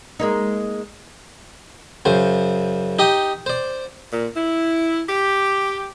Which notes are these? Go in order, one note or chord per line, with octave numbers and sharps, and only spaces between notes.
G#3 A#3 D#4
F#2 C#3 C5
D#4 G4 D#6
C5 D5
A#2
E4
G4